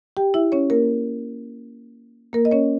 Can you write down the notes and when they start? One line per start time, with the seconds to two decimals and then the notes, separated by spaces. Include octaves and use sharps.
0.17 G4 G5
0.34 E4 E5
0.52 C#4 C#5
0.70 A#3 A#4
2.33 A#3 A#4
2.45 D#5
2.51 C#4 C#5